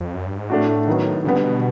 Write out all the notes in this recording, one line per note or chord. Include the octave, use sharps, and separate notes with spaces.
F2
F#2
G2
G#2
A2 A3 D4 F#4
D#3 F#3 B3
A#2 D3 G3 B3
C3
B2